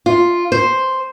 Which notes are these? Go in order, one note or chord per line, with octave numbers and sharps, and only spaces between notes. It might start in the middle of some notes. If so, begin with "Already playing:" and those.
F4
C5